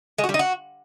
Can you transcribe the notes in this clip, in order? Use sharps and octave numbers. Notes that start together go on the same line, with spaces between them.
G#3
F#4
G3
D#4
F#4